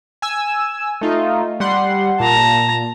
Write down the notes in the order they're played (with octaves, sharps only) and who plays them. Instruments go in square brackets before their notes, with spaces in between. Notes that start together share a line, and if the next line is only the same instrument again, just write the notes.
[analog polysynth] G#5 E6
A3 D#4 F4
G3 F#5 C6
[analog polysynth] A#2 [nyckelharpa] A5 A#5